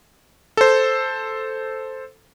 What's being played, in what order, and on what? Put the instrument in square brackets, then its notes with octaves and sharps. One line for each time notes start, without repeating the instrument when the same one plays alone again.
[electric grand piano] A4 C5